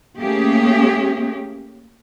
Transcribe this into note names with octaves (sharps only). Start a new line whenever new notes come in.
A3 A#3 C#4 G4 G#4